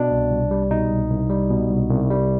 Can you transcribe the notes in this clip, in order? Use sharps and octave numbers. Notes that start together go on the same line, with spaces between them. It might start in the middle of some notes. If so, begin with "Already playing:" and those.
Already playing: B2 D4
C2
C2
G3
B2 D#4
C2
C2
G3
B2
C2
C2
G3